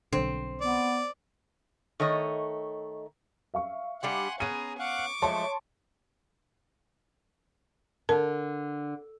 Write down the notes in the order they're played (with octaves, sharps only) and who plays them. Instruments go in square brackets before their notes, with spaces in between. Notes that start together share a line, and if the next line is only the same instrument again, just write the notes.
[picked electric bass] B1 D3 [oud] C4
[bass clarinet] B3 [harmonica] D5
[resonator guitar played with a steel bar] D#3 A3 C#5 D#5
[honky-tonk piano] E5 F5 C#6
[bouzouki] G3 D4 G4 [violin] F#5 [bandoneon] G#5 C6
[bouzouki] B3 C#4 [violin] G#4 [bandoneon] A#5 D#6 [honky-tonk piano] D#7
[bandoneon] F5 F#5 F#6 [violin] C#6 D6
[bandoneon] F3 G#3 [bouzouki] F#3 A3 [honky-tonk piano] C#5 A5 C6
[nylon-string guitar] D3 [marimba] A#4 A5